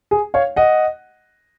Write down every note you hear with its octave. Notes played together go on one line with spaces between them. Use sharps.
G#4
C#5 F5
D#5 F#5